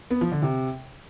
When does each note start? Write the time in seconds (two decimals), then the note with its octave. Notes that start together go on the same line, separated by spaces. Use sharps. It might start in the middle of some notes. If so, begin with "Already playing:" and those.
0.11 B3
0.21 F3
0.32 D3
0.42 C3